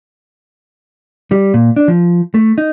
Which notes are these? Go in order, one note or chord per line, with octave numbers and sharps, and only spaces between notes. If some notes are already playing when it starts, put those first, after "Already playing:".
G3
A#2
D4
F3
A3
D#4